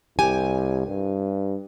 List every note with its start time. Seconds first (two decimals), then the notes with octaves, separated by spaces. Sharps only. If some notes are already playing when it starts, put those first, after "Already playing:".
0.19 C2 G4 G#5
0.87 G2